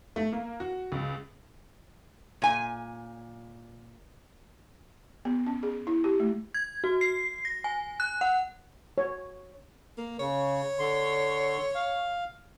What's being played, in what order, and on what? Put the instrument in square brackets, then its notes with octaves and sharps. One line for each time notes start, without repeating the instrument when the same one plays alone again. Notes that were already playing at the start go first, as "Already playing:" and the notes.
[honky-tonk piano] A3
A#3
F#4
C#2
[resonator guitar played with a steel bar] A#2 G#5
[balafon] B3
C#4
G#4
E4
G4
A3
[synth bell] G#6
F#4
C7
A#6
G#5
F#6
F#5
[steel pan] C#5
[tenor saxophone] A#3
[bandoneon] C#3 [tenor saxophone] C#5
[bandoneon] D3 C6
F5